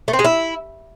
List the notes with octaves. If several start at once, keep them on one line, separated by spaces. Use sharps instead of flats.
A3
C4
G#3
E4